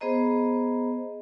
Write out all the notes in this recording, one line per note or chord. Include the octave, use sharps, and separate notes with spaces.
B3 G#4 C5 D#5 A#5